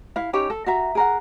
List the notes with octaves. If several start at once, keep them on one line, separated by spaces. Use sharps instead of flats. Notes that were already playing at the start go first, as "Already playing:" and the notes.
E4 F5
C#4 D#4 G4 C#5
A4
F#4 E5 A#5
G#4 A#4 F#5